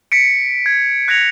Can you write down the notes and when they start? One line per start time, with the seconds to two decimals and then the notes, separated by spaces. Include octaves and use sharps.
0.12 B6 C#7 D7
0.66 G#6
1.08 F#6 G#6 A#6 C#7 F7